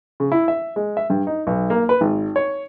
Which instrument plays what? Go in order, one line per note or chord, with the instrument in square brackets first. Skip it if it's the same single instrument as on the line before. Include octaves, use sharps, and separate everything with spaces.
[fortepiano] C#3
E4
E5
G#3
E5
G2
D#4
B1
A#3
B4
G#1
C#5